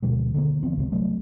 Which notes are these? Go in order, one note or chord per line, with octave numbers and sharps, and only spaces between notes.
D2 B2 F3 G#3
D3 D#3 G#3 A#3
E3 F3 B3 C4
G#1 C#2 C3
C2 C3 F#3 A3